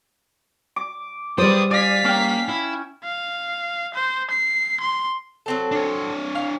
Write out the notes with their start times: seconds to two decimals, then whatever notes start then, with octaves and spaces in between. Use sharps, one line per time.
0.76 D6
1.38 G3 B4 C5 D5 G5 D#6
1.71 D5 F5 G#5 B6
2.05 A#3 C#4 G5
2.49 E4
3.04 F5
3.94 C5
4.31 C7
4.80 C6
5.46 F#3 C4 A4
5.71 D4 C#5
6.35 F5